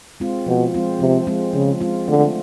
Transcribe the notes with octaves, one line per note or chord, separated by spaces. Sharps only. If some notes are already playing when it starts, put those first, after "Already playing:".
G#3 C4 F4
B2 F3
G#3 C4 F4
C3 F3
G#3 C4 F4
C#3 F3
G#3 C4 F4
D3 A3